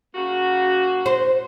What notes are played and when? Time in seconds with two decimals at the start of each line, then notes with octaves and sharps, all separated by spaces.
0.14 C#3 A#3 F#4
1.06 C5